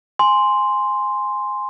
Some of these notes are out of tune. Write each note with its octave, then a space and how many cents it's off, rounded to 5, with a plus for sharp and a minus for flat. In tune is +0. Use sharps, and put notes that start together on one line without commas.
G#5 +0 C6 +0